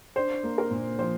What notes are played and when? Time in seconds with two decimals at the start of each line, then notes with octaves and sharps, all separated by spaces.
0.16 D4 C5
0.43 A#3
0.58 A#4
0.71 A#2
0.99 F3 C5